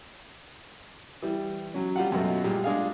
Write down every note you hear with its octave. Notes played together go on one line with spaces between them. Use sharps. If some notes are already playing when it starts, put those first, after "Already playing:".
E3 G3
F#3 C#4
G3 F4 F#5
F#2 B2 A3
A#2 G3 G#3
G#3 D4 G#4 F5